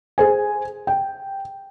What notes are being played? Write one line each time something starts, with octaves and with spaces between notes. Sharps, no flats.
G#4 C5 G#5
G5